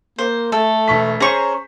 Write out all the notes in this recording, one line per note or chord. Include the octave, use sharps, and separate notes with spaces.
A#3 C5
A3 A4
E1 C#6 B6
C#4 G#4 C5 A#5 C#6